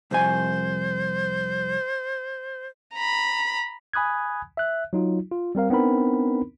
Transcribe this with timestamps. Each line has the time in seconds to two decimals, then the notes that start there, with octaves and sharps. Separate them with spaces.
0.11 C2 F2 C5 G#5
2.95 A#5 B5
3.93 G#5 B5 D#6 F#6 G#6
4.57 E5 F#6
4.93 F#3 D#4 F4
5.31 F4
5.55 G3 C4 A#4 F5
5.70 B3 C4 D4 D#4 A#4 B5